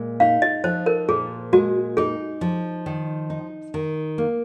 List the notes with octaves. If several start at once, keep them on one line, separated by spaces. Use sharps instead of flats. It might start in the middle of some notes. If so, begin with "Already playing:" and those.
Already playing: A#2 G#3
D#4 F5
D#5
F3 C5
A#4
A#2 G#4
G#3 F#4
D#4 G#4
F3
D#3
D#4
D#3
A#3